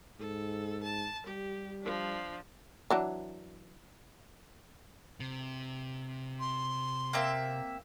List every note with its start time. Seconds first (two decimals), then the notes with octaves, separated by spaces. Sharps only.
0.20 G#2 A4
0.83 A5
1.26 G3 G4
1.83 F3 D4
2.90 E3 F#3 D4
5.20 C3
6.40 C6
7.13 A#3 C4 E5